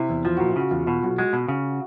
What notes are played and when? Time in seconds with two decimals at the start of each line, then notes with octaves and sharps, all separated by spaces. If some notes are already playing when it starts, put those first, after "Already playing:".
Already playing: C3 E4
0.10 E2
0.25 F3 F4
0.37 A#2 F#4
0.48 F4
0.56 C#3 F#4
0.71 E2 F4
0.87 B2 F4
1.03 B1 F#4
1.18 G#3 F#4
1.33 B2
1.48 C#3